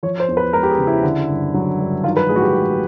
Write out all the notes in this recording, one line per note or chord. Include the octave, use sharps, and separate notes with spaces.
F3 C#5
C5
E2
B4
G#3 A#4
G4
G#4
C#3
E4
D3
G1
F#3
G2
D#3 F4
B4
A1 G#4
F#4
G4
G#3